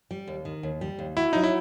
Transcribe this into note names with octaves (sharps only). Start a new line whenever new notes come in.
G3
D#2
D#3
D#2
G3
D#2
E4 F#4
F#3 D#4
E4